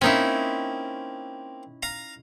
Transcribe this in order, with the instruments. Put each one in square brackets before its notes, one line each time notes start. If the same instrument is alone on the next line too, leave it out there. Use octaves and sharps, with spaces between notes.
[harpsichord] A#3 C4 [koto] C#4 D#4 E4
[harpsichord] F5 A#5